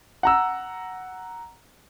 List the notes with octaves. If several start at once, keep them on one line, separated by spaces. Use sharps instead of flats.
F#5 A#5 E6